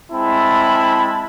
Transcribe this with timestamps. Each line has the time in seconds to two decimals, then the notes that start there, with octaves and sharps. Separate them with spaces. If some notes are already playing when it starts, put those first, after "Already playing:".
0.12 G#3 C4 E4 A5 B5